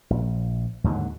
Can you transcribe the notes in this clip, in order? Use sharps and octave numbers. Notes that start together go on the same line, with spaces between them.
A#1
D#2 G#2 D3 F#3